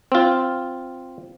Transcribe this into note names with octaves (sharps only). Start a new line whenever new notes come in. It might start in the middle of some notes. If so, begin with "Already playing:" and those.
C4 F4